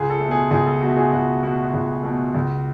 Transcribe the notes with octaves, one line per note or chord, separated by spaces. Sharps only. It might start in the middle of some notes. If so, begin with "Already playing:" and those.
Already playing: C#2 G#4
A4
B2 A3
G#4
C#2 G#4
A4
B2 A3 F#4
G#4
C#2 F#4
B2 A3 F#4
C#2
B2 A3
C#2